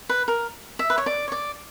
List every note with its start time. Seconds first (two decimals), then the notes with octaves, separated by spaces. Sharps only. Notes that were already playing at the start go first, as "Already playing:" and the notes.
0.09 B4
0.28 A#4
0.79 E5
0.90 B4
0.98 C#5
1.06 D5
1.28 C#5
1.32 D5